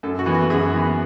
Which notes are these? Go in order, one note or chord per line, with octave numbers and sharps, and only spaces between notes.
F#2 A4
F#4
E3 B3
F#4
F#2 G#4
E3 B3